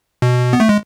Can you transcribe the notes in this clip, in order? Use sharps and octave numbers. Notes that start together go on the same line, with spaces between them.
B2
B3
A3
G#3